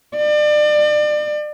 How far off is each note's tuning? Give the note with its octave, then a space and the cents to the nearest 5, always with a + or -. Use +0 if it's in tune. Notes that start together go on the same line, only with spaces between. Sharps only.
D5 +35